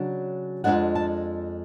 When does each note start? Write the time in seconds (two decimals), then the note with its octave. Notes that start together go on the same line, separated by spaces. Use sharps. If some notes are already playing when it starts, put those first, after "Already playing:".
Already playing: C#3 F#3 D4
0.64 F2 C#3 G#3 D4 F#5
0.95 A5